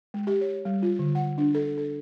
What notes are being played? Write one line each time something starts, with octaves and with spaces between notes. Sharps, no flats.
G#3
G4
C#5
G3
F4
D3
F#5
D4
A4
A4